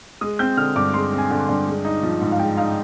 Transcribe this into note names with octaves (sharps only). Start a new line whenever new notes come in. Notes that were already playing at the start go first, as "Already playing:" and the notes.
G#3 D#6
C4 G6
D3 F6
G2 D6
G#3 C6
C4
G#5
D3
G2
G#3
D#4
F3
G#2
F5
G#3 G5
D#4 F5